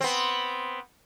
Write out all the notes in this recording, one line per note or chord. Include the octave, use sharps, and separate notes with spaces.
B3 C4